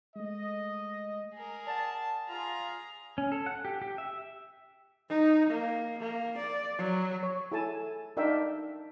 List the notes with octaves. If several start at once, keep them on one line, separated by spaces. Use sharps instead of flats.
G#3 A3 D#5
G#4 A#4
D5 F#5 A5
F4 G#4 A#5
C#4
A4
F#5
G4
G4
E5
D#4
A#3
A#3
D5
F#3
C#5
E4 G#4 A4 G#5 A5
D4 D#4 A#4 E5 F5 G5